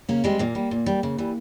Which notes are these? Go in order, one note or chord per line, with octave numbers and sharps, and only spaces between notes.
C#3 A#3 C#4
G3 G#3 C4
A#2 A#3
G3
A#2
G3
C#3
E3 G3